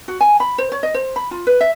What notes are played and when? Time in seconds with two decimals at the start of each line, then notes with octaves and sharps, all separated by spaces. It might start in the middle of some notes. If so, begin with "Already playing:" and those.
0.08 F#4
0.21 G#5
0.40 B5
0.58 C5
0.72 C#5
0.83 D#5
0.94 C5
1.16 B5
1.31 F4
1.47 B4
1.61 E5